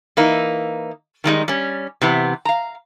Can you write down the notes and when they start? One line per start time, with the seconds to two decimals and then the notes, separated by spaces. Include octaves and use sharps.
0.17 E3 A#3 D#4
1.24 D#3 G3 G#3 D#4
1.48 G3 C#4
2.02 C3 E3 B3
2.45 F5 A#5